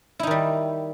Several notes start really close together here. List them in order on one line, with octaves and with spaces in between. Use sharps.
E4 D#4 D#3 G3